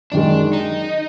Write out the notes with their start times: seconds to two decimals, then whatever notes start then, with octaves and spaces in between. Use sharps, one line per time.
0.12 F#2 D#3 G#3 D4
0.53 D#4